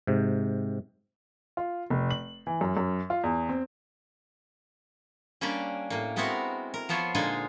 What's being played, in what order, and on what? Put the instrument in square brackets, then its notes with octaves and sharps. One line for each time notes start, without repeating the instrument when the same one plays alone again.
[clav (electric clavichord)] G#2 C3
[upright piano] F4
F1
F#7
E3
F#2
F#2
F4
E2
C4
[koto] G3 A#3 C#4 D4 G4 D5
A2 A#3
G#3 B3 C4 E4 F#4 A#4
A#4
F3 B3 F4 C5 C#5
A#2 D3 G#3 D#4 F4 G#5